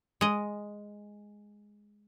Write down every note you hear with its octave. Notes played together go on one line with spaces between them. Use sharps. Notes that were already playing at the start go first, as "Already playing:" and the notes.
G#3 D#5